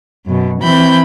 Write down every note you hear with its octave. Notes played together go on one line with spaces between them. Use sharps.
F#2 B2
E3 C4 B5 G6